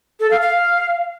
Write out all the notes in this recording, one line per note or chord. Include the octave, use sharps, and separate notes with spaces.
A4
F5
F5